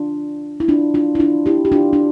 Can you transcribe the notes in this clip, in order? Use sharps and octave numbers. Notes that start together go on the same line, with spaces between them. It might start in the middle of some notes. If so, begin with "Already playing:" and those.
Already playing: D4 F4
E4
D4 F4
D4 F4
E4
D4 F4
E4 G4
G4
D4 F4
D4